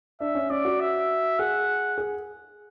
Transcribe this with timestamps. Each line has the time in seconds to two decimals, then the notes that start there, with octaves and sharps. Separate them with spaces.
0.21 D4 E5
0.35 C#4
0.50 C#4 D5
0.65 F#4
0.80 E5
1.39 G#4 F#5
1.98 G#4